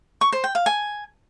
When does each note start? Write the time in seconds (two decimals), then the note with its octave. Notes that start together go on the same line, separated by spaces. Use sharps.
0.21 C#6
0.32 C5
0.44 G5
0.55 F5
0.66 G#5